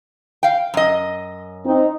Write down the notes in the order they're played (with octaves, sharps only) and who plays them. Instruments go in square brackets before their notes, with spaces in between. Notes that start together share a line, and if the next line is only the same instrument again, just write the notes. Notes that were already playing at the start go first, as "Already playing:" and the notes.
[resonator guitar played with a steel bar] F5 G5
F#2 D#5
[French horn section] C4 D#4